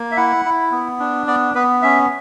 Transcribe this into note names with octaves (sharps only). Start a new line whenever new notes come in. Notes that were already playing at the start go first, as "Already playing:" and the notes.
Already playing: A#3
E5
E4 F#5
E4
B3
D4
B3 D5
B3 B4
C#4 E5